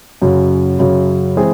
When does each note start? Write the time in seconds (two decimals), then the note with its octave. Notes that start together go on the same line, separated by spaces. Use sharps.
0.22 F#2 C#3 F#3
0.79 F#2 C#3 F#3
1.37 E3 G#3 C4 E4 G#4